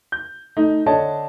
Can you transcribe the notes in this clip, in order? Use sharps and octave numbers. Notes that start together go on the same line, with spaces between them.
G6
A3 D#4
D3 D4 A4 C#5 D#5 A5